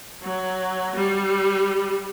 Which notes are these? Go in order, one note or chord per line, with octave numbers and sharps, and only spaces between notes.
F#3
G3